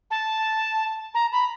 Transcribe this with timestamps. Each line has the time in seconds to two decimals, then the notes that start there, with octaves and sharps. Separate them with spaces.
0.11 A5
1.14 A#5
1.32 B5